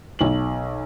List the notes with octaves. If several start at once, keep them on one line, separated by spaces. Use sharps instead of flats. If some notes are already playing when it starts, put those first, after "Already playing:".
B1 F#7